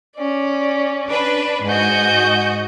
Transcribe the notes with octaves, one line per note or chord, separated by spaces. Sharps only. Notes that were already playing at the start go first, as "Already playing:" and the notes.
C#4 D5
D4 B4
G#2 F#4 D#5 G#5 G6